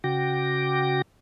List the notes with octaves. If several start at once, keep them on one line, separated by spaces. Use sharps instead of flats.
C#3 F#4 G5 D6 A#6